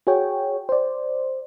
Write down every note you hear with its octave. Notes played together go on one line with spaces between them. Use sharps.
F#4 G#4 C#5 G5
C5 D5